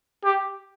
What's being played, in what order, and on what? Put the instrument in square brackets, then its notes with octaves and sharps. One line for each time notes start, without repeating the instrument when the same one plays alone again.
[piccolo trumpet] G4